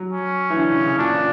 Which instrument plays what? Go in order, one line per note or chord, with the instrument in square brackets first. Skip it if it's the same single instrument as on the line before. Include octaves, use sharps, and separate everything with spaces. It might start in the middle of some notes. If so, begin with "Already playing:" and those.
Already playing: [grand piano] F#3
[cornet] C#4
[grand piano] E3
D3
C#3
C#3
[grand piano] A#2 [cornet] D4